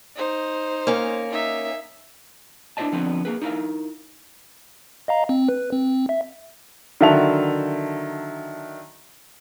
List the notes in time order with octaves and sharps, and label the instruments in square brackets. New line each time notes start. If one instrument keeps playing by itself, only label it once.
[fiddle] D#4 C5
[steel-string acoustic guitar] A#3 C#4
[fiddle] D#4 E5
[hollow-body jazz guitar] D4 E4 F#4 C5 D#5 A5
D3 F3 B3 C4
A#3 G#4 B4
D#4 E4 A#4 F5
[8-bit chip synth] D#5 F5 A#5
C4
B4
C4
E5
[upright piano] D3 D#3 F#3 E5 A5 F7